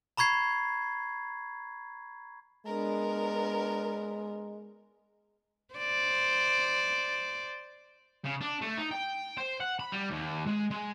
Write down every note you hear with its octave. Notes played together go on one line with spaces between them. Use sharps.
A#5 B5 C#6 G#6 C7
G#3 B3 D4 A#4
C5 D5
C#3
D4
A3
D#4
G5
C5
F#5
B5
G3
D#2
G#3
G#3